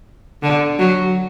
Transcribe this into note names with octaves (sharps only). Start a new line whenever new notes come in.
D3
F#3